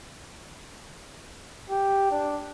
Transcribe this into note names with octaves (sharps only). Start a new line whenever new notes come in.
G4
D4